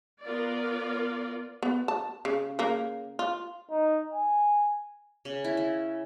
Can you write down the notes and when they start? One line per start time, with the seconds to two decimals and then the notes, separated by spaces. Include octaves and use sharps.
0.23 B3 F4 A#4 D5
1.63 B3
1.88 A5
2.25 C#3
2.59 C#3 A#3
3.19 F4
3.70 D#4
4.13 G#5
5.25 C#3
5.44 E4
5.57 E4